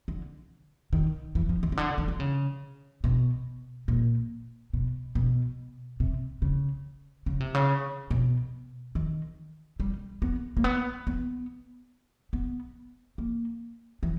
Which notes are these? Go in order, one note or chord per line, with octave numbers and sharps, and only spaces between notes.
D3
D#3
E3
F3
D#3
C#3
D3
D#3
D3
C#3
B2
A#2
B2
B2
C3
C#3
C#3
C3
C#3
B2
D#3
G3
B3
A#3
B3
B3
B3
A#3
E3